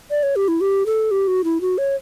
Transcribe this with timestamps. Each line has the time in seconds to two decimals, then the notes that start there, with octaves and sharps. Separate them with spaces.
0.10 D5
0.23 C#5
0.36 G4
0.48 E4
0.61 G4
0.86 A4
1.11 G4
1.28 F#4
1.44 E4
1.61 F#4
1.78 C#5